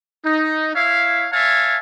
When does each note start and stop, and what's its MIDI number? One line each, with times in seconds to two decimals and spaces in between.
0.25 0.72 63
0.74 1.27 64
0.74 1.27 73
0.74 1.27 76
0.74 1.27 77
1.32 1.77 73
1.32 1.77 76
1.32 1.77 77
1.32 1.77 80
1.32 1.77 81